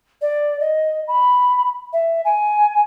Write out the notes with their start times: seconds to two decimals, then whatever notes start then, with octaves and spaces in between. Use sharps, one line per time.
0.22 D5
0.60 D#5
1.08 B5
1.93 E5
2.25 G#5